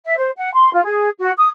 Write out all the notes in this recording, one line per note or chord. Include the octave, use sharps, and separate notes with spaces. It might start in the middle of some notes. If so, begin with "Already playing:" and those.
E5
C5
F#5
C6
F4
G#4
F#4
D#6